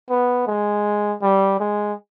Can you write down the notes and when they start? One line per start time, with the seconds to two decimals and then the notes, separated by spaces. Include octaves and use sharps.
0.10 B3
0.47 G#3
1.22 G3
1.60 G#3